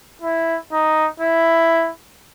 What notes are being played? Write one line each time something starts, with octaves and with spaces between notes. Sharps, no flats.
E4
D#4
E4